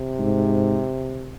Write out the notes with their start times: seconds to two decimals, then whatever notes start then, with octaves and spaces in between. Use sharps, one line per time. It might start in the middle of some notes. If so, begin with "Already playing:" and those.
Already playing: C3
0.19 G#2